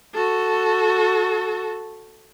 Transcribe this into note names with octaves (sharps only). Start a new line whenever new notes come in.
F#4 A4